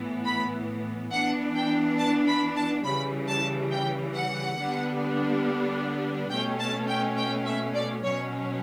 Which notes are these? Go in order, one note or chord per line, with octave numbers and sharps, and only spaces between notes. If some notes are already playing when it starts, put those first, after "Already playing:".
Already playing: A2 E3 B3
B5
E3 B3 D4 F#5
G5
A5
B5
A5
C#3 E3 G3 B5
A5
G5
F#5
D3 G3 B3 D4
B2 A3 C#4 G5
A5
G5
G5
E5
D5
B2 F#3 C#4 C#5